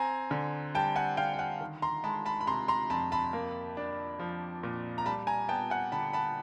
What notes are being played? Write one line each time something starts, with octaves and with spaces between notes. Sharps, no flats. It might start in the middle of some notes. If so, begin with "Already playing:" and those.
Already playing: C4 G#5 A#5
D3
G3 G5 A5
F#5 G#5
D3 F5 G5
G5
F#5 G#5
D#3
A#5 C6
G#3 A5 B5
A5 B5
B5
C3 A#5 C6
A#5 C6
F2 A5 B5
A5 B5
A#3
D4
F3
A#2
A#5
G3 A5 B5
G#5 A#5
B3 G5 A5
F#5 G#5
D3 A5 B5
A5 B5